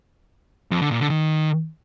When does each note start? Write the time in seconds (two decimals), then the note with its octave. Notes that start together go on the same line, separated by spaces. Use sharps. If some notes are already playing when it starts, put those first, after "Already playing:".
0.71 F2
0.81 D3
0.91 A#2
1.00 D3
1.10 D#3